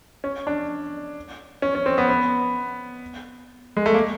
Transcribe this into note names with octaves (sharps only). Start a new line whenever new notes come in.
C#4
D4
C#4
C#4
C4
B3
B3
G#3
A3
A#3